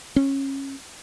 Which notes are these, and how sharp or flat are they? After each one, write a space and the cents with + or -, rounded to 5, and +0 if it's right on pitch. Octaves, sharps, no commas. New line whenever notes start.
C#4 -20